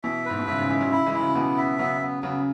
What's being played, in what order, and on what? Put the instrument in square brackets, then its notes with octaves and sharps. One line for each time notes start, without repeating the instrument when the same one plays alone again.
[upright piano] B2 E3 [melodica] E5
[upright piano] G#2 [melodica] B4
[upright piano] B2
[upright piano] G#2 C#3 [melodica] E5
[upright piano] G#2 C#3
[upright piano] E3 G#3 [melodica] E5
[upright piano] C#3 F#3
[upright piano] C#3 F#3 [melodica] E4
[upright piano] E3 G#3
[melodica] E4
[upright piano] C#3 F#3
[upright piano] B2 E3 [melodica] B3
[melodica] E5
[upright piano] C#3 F#3 [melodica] B3
[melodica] B3
[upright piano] C#3 F#3 [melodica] B3